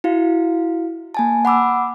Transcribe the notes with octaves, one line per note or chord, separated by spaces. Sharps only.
E4 F#4 F5
A#3 G#5 A5
F#5 B5 D6 E6